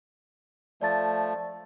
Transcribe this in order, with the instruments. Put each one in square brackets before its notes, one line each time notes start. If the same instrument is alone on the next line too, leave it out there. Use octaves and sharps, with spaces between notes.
[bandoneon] F3 A3 [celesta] D5 A5 A6